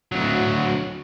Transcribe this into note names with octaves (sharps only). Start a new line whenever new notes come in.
D2 F#3